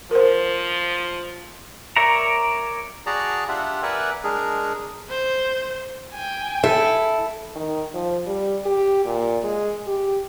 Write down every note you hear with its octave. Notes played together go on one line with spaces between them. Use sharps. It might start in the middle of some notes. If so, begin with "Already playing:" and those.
F3 A#4 C5
A#4 C#5 D5 E5 A#5
F#4 G#4 D5 A5 A#5
D4 F4 G4 E5 F#5
A#4 B4 D5 E5 F#5 G#5
G#3 D4 G#4 A#4
C5
G5 G#5
E4 A4
D#3
F3
G3
G4
A#2
G#3
G4